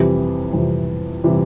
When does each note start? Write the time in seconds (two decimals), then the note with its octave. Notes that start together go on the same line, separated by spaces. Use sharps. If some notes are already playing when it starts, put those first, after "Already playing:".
Already playing: F2 C3 E3 G3
0.53 F2 C3 E3 G3
1.24 C3 E3 G3